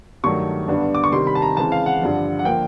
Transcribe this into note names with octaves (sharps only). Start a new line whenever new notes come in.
G2 D#3 F#3 A3 C#6
G2 D3 G3 B3 D4
D6
C#6
C3 D#3 G3 C6
B5
A5
A#5
C#3 E3 G#3 C4 A5
F5
F#5
G2 D3 F3
F#5
D3 F3 A#3 G5